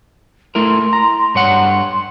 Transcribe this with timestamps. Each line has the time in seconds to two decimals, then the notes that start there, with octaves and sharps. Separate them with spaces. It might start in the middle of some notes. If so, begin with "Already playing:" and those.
0.55 A3 E4 A#4 C6
0.93 A#5
1.35 G2 C#5 F#5